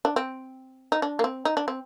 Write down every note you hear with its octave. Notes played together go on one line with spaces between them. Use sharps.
D4
C4
D#4
D4
A#3
C4
D#4
D4
C4